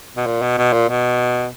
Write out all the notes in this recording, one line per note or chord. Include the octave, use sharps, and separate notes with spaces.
B2
A#2
B2
B2
A#2
B2